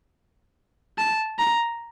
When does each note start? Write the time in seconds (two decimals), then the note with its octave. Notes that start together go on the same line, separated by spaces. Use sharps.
0.98 A5
1.39 A#5